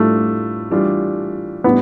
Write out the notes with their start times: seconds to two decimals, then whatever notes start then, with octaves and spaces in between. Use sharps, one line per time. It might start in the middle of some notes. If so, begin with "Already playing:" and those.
Already playing: A2 G3 A3 D4 F4
0.70 E3 G3 D4 F4
1.64 A2 G3 B3 D4